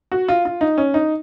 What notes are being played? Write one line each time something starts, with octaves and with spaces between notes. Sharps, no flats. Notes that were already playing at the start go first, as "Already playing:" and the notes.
F#4
F4
F4
D#4
C#4
D#4